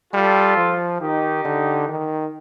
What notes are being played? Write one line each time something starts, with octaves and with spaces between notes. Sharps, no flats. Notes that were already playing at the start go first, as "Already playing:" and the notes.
G3 F4 A4
F3
D#3 D#4 G4
D3
D#3